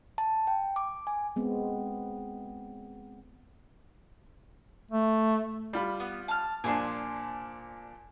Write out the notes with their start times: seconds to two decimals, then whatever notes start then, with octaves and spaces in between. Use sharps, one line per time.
0.18 A5
0.47 G5
0.76 D6
1.07 G#5
1.36 G#3 B3 C4
4.91 A3
5.73 G3 F4 B5
6.00 B3
6.28 A5 F6
6.64 A#2 F3 D4 G#5 C6